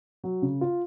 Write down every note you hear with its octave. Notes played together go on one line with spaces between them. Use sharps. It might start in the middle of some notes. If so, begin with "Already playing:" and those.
F#3
C#3
F4